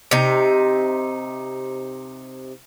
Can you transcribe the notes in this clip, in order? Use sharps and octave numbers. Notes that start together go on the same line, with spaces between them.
C3 D#4